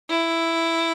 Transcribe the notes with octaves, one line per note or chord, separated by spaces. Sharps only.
E4